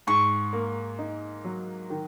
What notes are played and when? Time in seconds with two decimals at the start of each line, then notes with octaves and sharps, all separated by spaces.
0.07 G#2 C#6
0.53 A#3
0.99 D#4
1.44 F#3
1.90 D#3